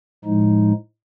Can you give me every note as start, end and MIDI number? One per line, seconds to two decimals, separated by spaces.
0.25 0.72 45
0.25 0.72 53
0.25 0.72 56
0.25 0.72 63